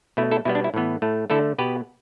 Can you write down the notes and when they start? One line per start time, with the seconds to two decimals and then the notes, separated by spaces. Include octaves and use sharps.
0.17 B2 A3 E4
0.31 E4 A4
0.45 B2 G3 B3 E4
0.55 D4
0.64 E4
0.74 A2 E3 B3
1.02 A2 A3
1.30 D3 A3 E4 A4
1.58 B2 B3 G4 B4